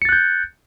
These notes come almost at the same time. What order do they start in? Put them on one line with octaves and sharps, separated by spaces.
C#7 A6 F#6 G6